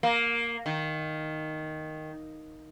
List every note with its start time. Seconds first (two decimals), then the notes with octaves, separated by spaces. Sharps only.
0.03 A#3
0.66 D#3